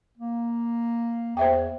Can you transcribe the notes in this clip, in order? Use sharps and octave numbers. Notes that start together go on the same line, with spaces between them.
A#3
E2 C5 E5 G5